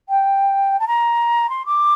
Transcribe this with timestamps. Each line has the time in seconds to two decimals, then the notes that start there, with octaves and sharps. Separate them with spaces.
0.09 G5
0.80 A5
0.88 A#5
1.50 C6
1.66 D6